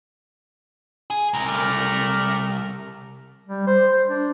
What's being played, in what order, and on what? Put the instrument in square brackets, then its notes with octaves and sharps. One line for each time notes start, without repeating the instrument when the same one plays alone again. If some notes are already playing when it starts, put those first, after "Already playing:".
[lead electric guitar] G#4
[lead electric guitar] C2 [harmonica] A#5
[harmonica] A3 A#4 D5
[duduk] G3
C5
C5
D4